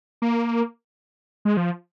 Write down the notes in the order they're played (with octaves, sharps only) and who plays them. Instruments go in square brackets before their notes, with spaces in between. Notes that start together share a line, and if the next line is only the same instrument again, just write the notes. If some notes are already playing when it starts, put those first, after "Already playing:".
[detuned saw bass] A#3
G#3
F3